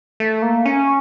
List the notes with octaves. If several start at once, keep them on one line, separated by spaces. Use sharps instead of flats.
A3
A#3
C#4